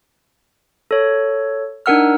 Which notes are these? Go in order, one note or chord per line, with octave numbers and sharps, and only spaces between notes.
A4 C#5
D4 D#4 A#4 F#5 E6 F6